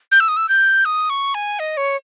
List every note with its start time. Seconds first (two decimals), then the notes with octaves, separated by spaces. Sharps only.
0.11 G6
0.20 E6
0.28 D#6
0.36 E6
0.49 G6
0.85 D#6
1.10 C#6
1.34 G#5
1.59 D#5
1.77 C#5